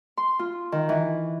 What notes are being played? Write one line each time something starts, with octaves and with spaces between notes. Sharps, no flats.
C6
F4
D#3
E3